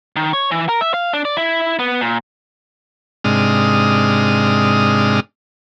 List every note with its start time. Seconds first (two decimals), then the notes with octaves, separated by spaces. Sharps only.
0.16 D#3
0.33 C#5
0.51 E3
0.69 A#4
0.81 E5
0.94 F5
1.13 D4
1.25 D5
1.37 E4
1.79 B3
2.01 A#2
3.24 G#2 C3 G#3 D4 D#6 F6